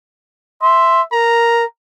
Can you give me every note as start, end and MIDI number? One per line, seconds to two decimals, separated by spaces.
0.62 1.03 76
0.62 1.01 84
1.12 1.65 70
1.12 1.64 82